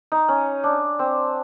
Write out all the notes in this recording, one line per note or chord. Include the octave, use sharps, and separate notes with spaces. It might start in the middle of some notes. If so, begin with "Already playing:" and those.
D#4
C#4
D4
C4